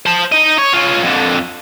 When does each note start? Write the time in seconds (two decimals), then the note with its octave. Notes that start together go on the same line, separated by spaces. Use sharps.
0.06 C5 A5
0.32 D#4 D#5
0.58 C#5
0.73 C#4 F4
1.03 F2 D3